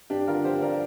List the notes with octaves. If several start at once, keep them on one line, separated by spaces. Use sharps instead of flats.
G2 D4 G4
D3 F4 A#4
F3 G4 C5
G2 A#4 D5